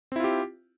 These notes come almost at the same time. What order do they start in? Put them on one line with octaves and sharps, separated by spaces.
C4 E4 F4 G4